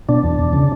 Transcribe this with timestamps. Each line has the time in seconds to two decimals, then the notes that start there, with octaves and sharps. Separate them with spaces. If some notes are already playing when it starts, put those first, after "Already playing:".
0.09 B2 D4
0.23 E2
0.39 E2
0.53 C#3